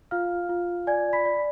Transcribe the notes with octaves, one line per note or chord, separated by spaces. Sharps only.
F4 F5 F6
F4
D5 G#5 G#6
B5 B6
D5